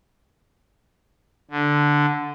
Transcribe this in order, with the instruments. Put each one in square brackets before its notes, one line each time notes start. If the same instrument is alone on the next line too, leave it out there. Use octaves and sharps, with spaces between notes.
[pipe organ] D3